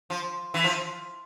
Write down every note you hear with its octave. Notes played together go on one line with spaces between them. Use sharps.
F3
E3
F3